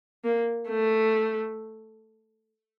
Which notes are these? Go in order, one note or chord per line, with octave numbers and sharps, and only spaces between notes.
A#3
A3